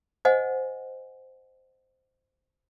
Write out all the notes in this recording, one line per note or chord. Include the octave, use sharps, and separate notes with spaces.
C5 D#5 F#5 G#5